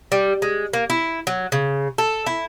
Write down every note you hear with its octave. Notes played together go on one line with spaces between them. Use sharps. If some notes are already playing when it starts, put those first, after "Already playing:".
G3
G#3
A#3
E4
F#3
C#3
A4
E4